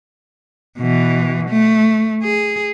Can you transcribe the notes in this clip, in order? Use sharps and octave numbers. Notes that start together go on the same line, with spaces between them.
B2 E3
A3
G#4